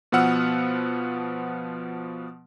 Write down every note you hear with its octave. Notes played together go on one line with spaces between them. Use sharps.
B2 F3 B3 F#5 E6 F6